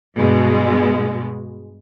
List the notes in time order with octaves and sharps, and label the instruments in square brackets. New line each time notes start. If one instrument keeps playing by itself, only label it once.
[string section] G2 B2 G#3